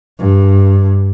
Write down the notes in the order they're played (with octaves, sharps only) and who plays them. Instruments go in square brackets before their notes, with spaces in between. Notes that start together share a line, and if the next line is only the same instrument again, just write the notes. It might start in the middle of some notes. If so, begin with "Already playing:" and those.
[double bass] G2